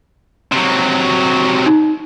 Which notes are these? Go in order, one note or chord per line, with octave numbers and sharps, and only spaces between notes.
C3 F#3
D#4